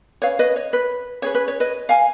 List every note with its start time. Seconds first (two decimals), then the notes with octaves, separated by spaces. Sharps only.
0.22 C#4 G#4 B4 C#5 F5
0.39 B4 D#5
0.56 C#5
0.73 B4
1.22 C#4 G#4 B4 C#5
1.35 B4
1.48 C#5
1.60 B4 D#5
1.89 F5 G#5